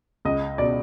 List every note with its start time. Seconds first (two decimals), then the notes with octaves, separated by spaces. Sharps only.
0.25 C#2 D#5
0.58 B2 D5